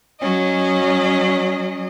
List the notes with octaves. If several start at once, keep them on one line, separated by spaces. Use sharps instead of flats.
F#3 C#4 D#5